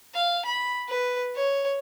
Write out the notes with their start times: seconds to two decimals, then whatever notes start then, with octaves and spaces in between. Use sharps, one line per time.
0.14 F5
0.45 B5
0.88 B4
1.35 C#5